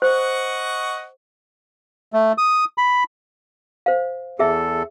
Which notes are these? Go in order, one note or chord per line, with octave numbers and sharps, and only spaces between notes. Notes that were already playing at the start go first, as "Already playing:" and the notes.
C5 D#5 F#5 C#6
A3
D#6
B5
C5 F5
E2 G#4 A4 E5